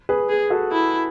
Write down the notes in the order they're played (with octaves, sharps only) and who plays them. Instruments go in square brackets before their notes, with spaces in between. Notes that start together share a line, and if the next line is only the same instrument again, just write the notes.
[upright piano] G#4 B4
[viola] G#4
[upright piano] F#4 A4
[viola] E4